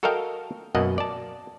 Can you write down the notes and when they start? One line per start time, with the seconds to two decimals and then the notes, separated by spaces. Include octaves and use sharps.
0.03 F#4 A4 A#4 D#5 F5 G5
0.75 F#2 B2 A#3 D#5 F#5
0.98 D5 A5